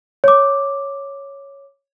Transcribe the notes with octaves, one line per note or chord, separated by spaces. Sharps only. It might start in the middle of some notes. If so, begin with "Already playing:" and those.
C#5 D6